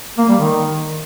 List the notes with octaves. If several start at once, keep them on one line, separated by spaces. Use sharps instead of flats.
A#3
G3
D#3